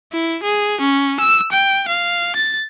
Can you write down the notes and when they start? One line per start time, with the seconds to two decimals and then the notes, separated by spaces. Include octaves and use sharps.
0.12 E4
0.43 G#4
0.81 C#4
1.20 E6
1.52 G5
1.88 F5
2.36 A6